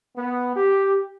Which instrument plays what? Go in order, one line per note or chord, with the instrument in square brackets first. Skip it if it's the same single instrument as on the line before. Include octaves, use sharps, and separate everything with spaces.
[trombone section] B3
G4